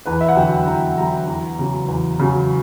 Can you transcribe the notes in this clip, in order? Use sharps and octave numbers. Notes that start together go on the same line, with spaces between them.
E2 B4
E5
F#5
D3 F#3 G5
E2 A#5
D3 F#3 A#5
E2
C#3 F#3
E2
C#3 F#3